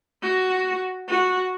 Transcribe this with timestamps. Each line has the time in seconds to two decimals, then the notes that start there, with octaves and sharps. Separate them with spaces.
0.23 F#4
1.08 F#4